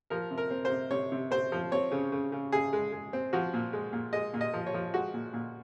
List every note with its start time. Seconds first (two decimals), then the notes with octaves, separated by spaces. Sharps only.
0.10 F3 A#4
0.31 C3
0.38 A#4
0.50 C4
0.65 C5
0.70 C3
0.91 C3 C#5
1.12 C3
1.31 C4 C5
1.52 F3
1.72 C4 C#5
1.91 C#3
2.12 C#3
2.32 C#3
2.52 C#3 G#4
2.73 G#3
2.92 G#3
3.13 C4
3.33 F3 F#4
3.53 A#2
3.73 G#3
3.93 A#2
4.13 G#3 D#5
4.34 A#2
4.41 D#5
4.53 F3
4.67 C#5
4.74 F3
4.93 G#3 F#4
5.14 A#2
5.33 A#2